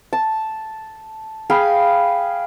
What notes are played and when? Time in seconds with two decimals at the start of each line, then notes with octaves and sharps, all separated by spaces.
0.13 A5
1.50 G#4 F5 G5 B5